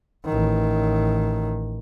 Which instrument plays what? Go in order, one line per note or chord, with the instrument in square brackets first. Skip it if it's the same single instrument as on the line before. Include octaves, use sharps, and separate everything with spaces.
[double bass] A1 D#3